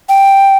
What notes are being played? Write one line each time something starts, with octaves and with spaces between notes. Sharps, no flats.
G5